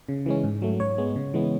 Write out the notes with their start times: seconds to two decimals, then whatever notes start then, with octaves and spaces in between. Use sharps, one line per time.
0.09 C#3
0.26 E3 G#3 C#4
0.44 G#2
0.62 F#3 A3
0.80 G#2 C#5
0.98 G#3 B3
1.16 C#3
1.34 E3 G#3 B3